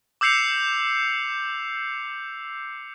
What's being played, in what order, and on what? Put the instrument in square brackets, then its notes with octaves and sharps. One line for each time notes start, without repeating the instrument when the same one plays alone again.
[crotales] D6 E6 G6 C7 C#7 F7